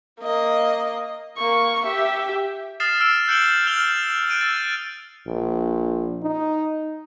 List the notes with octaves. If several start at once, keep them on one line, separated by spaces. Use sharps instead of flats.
A#3 D#5
A#3 C#6
G4 E5
D#6 F6 A6 C7 E7
E6 F6 C7 D7 E7
F#6 G6 C#7 D7 F#7 G7
F6 G6 F7 G7
F#6 G6 D7 D#7
E6 A6
A#1
D#4